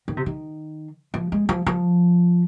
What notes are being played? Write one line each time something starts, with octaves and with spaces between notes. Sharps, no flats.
D#3
C3
D#3
F3
G#3
F3
F3